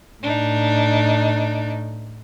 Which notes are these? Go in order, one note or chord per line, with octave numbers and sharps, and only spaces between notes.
A2 D4 D#4